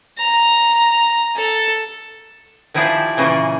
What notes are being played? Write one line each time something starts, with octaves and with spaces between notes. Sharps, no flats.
A#5
A4
D#3 F3 E4 G4 G#4 D5
A#2 C#3 E3 A#3 D5 G#5